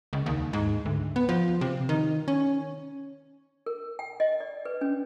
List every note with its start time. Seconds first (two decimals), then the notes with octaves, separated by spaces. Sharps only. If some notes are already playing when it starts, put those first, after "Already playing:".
0.13 C#2
0.26 D#2
0.53 G#2
0.85 D2
1.16 B3
1.29 F3
1.61 C3
1.89 D#3
2.28 C#4
3.66 A#4
3.99 G5
4.20 D#5
4.40 D5
4.65 B4
4.81 C#4